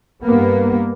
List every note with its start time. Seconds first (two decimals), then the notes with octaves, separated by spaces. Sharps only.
0.23 G2 A#3 B3